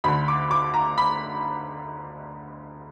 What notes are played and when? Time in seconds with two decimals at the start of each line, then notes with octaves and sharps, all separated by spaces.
0.04 D2 D3 B5
0.28 D6
0.51 D6
0.74 A#5
0.98 B5